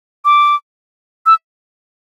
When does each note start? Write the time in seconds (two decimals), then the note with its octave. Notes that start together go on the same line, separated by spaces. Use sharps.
0.25 D6
1.26 E6